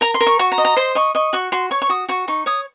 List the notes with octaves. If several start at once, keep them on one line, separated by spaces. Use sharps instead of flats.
A#4 A#5
C6
A#4
C#6
F#4 C#6
A#5
D#5
A#5
C5 C6
D#5 C#6
D#5 C#6
F#4 C#6
F#4 C6
C#5 C#6
C#6
F#4 D#6
F#4 C#6
D#4 C#6
C#5 D#6